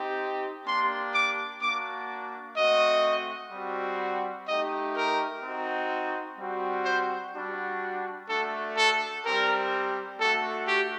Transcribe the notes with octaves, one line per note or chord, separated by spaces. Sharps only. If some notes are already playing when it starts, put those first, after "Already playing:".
Already playing: C4 D#4 G4
A#3 D4 G4 C6
D6
A#3 D4 F#4 D6
A3 C4 F#4 D#5
G3 C4 F#4
A3 D#4 G4 D#5
A#4
C4 D#4 F#4
G3 C4 F#4
C5
G3 D4 F#4
A3 D4 F#4 A4
A4
G3 C4 G4 A#4
A3 D4 F#4 A4
G4